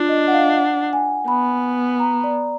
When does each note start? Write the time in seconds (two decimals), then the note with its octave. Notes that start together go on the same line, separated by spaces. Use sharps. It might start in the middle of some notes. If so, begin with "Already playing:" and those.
Already playing: D4 F4
0.09 D#5
0.28 F#5
0.33 F5
0.57 F#5
0.93 G#5
1.28 B3 B5
1.99 A#5
2.24 D5